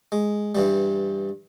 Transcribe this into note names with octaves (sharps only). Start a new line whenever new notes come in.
G#3
G2 E3 G3